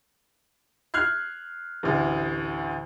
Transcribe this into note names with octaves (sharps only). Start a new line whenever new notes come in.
F6 F#6 G#6 C7
A1 D2